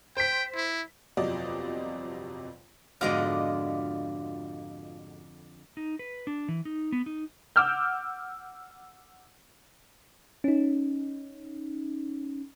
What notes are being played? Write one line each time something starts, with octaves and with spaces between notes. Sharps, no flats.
C5 G5 B6
E4
G1 F2 C3 F#3 D5 D#5
B1 F2 G#2 B2 D3 F4 D#5 D6
D#4
B4
D4
E3
D#4
B3
D#4
F#5 D6 E6 F6 G6
C#4 D#4